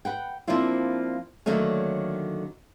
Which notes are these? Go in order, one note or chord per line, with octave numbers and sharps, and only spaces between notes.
B4 F#5 G5
F3 A#3 C4 D4 E4 F4
D3 D#3 F#3 A3 A#3 C#4